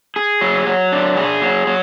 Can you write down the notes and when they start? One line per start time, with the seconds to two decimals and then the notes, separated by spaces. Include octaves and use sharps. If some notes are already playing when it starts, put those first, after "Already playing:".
0.16 G#4
0.41 F#3
0.67 F#3
0.92 D4
1.17 G#4
1.42 F#3
1.67 F#3